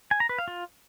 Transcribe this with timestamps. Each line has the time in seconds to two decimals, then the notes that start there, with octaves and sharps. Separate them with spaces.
0.11 G#5
0.20 A#5
0.29 B4
0.39 F5
0.48 F4